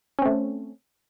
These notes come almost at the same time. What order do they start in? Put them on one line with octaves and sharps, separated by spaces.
C#4 C4 A3